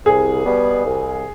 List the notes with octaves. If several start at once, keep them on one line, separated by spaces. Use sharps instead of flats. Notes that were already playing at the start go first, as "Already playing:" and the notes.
C2 G#4
B2 G3 B3
C2